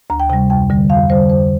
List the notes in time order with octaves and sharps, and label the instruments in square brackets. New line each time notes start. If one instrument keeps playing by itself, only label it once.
[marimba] D2 A#5
G5
C3 G5
G3
F2 G5
D3 G3
F2 F5
D3 G3 C5
F2 C5